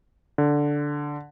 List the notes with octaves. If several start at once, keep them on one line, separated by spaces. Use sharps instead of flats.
D3